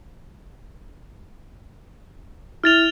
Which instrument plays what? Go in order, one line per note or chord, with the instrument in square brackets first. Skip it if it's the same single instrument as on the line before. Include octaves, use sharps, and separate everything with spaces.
[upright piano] E4 [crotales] F6 A6 F7